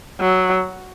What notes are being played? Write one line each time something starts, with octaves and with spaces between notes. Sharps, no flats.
F#3